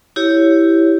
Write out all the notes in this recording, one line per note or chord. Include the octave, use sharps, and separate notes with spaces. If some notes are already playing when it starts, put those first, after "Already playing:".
E4 G4 C#5